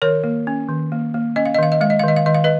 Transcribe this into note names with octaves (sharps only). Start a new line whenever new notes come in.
D#3 A#4 C#5
A#3
C#4
D#3
A#3
A#3
C#4 D#5
F5
D#5
D#3 F5
D#5
G#3 F5
D#5
D#3 F5
D#5
F5
D#3 D#5
F5
B4 D#5